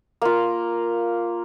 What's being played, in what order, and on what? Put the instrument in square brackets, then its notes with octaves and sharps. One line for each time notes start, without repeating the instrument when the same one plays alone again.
[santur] A#3 F4